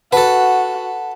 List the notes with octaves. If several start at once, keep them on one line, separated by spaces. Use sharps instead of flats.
F#4 A4 B4 F#5 A5